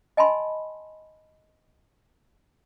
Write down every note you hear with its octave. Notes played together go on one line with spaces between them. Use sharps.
D#5 G#5 A5 B5 C6